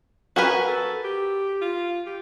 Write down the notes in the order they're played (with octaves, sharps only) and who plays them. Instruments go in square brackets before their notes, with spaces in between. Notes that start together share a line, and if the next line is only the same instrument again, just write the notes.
[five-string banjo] F#4 A#4 B4 [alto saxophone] G#5
[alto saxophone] A4
G4
F4
G4